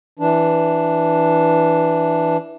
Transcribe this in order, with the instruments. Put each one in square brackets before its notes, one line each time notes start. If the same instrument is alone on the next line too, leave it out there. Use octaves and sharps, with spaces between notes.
[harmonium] E3 D4